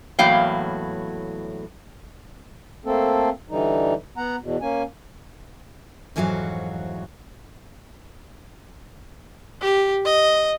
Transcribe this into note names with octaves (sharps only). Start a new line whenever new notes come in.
E2 A2 F#3 A#3 F5 G5
A3 A#3 C4 A4
D3 E3 G3 D#4
B3 F#5 A#5
E2 B2
A#3 C#4 G#5
F2 G#2 E3 F#3 F#4 F5
G4
D#5